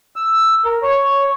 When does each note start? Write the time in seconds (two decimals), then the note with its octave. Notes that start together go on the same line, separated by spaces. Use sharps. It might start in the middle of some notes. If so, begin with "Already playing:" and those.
0.16 E6
0.65 A#4
0.83 C#5